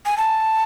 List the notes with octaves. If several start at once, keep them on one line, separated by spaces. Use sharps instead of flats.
G#5
A5